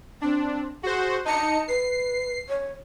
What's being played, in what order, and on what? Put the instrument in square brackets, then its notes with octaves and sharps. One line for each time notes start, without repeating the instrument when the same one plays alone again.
[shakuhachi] C4 [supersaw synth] D4
[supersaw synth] F#4 C5 [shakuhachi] G#4
[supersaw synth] D#4 C#7 [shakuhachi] A5
[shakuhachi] B4 [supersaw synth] C7
[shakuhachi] C#5